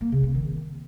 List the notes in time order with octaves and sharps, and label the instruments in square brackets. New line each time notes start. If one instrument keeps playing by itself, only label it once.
[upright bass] A#3
C#3
C4
D#3